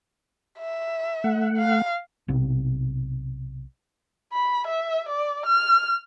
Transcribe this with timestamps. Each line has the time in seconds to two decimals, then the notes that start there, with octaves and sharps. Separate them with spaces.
0.59 E5
1.24 A3 F#5
1.57 F5
2.28 B1 C3
4.32 B5
4.67 E5
5.08 D5
5.46 F6